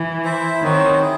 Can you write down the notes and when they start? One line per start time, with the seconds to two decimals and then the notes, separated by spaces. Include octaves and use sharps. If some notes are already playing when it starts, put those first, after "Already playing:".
Already playing: E3
0.24 E4 C5 E5
0.62 D#3 F#3 C4 F#4 C5
1.02 E4 G#4